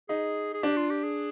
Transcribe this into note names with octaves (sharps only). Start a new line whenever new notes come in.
D#4 G#4
G#4
D4 G4
F4
G4
G#4